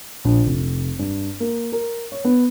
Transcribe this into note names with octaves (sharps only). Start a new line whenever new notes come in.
A#1
F1
G2
A#3
A#4
C#5
B3